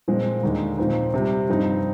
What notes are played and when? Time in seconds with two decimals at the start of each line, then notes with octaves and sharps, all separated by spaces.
0.08 A#2 F3 G#3 C4
0.43 D#2 D3 G#3 D#4
0.78 A#2 F3 C4 D#4
1.14 C3 G3 C4
1.49 G2 F3 C4 D#4